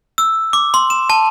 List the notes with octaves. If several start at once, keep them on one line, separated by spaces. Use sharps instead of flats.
E6
D6
C6
E7
A5